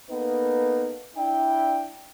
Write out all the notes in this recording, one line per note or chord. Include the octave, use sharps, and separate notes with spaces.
A#3 B3 D#4 A4 B4
D4 E4 G5